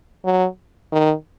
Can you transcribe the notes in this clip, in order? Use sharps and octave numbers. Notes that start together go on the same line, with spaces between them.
F#3
D#3